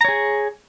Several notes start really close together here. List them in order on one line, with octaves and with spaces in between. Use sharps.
A#5 C#5 G#4